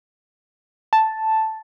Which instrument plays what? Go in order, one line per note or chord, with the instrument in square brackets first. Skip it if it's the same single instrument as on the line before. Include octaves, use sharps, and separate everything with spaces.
[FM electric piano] A5